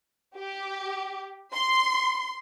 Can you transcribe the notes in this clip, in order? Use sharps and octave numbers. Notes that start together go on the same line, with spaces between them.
G4
C6